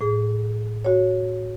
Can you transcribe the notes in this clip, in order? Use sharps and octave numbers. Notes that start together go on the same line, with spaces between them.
A2 G#4
F#4 C#5